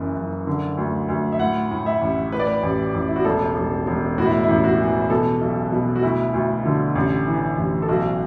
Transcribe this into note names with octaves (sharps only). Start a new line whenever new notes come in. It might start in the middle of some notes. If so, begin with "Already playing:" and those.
Already playing: F#1 F#2 E3
F#1
D3
D2
D2
E5
A2 F#5
A2
E5
A1
A2 B4
D5
B4
A1
A1
E4
F#4
E1 A4
E1
E1
A2 F#4
E4
E4
A1
F#4
E3
B2 A4
B1
B2
F#4
D2 E4
D2
D3
A1
E3
A1
A4
B1 F#4